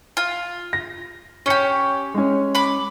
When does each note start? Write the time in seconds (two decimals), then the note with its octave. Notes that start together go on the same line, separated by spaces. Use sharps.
0.17 F4
0.73 A#6
1.46 C#4 G4 C#5 C#7
2.14 G#3 C#4
2.55 B5 D6